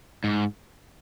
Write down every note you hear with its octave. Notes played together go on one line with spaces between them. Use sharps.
G#2